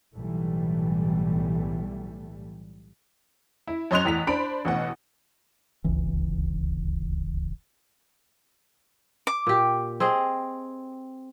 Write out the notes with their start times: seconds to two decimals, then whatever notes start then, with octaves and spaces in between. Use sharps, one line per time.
0.15 B1 A2 E3 G3 A3
3.68 E4
3.91 F#2 C#5 D#5 C6 F#6 F7
4.05 A1 E2 B6 F7
4.27 D4 C5 B5 D7
4.65 A1 B2 F#5
5.84 D1 G1 C#2 E3
9.27 D6
9.47 A#2 G4
10.00 C4 G#4 D#5